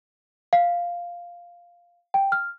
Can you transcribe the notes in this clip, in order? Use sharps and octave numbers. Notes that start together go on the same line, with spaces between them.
F5
G5
F6